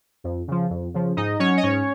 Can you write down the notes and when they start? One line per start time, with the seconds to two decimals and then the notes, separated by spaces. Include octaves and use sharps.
0.24 F2
0.48 C#3 F3
0.70 F2
0.94 C#3 F3
1.17 G#2 D#4 D#5
1.39 F#3 C#4 C#5
1.57 D#5
1.63 G#2 C#4 C#5